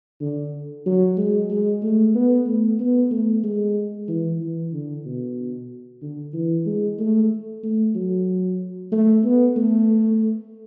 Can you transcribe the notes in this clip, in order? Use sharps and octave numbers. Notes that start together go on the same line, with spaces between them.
D3
F#3
G#3
G#3
A3
B3
A3
B3
A3
G#3
E3
E3
D3
B2
D3
E3
G#3
A3
A3
F#3
A3
B3
A3